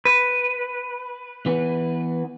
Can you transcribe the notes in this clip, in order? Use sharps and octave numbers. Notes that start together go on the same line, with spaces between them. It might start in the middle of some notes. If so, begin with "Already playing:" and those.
B4
E3 B3